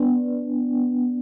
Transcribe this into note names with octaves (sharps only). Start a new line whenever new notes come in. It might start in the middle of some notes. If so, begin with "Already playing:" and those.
Already playing: B3 D4